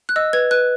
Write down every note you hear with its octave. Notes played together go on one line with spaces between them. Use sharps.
F#6
D#5 E6
B4 G#6
B4 F#6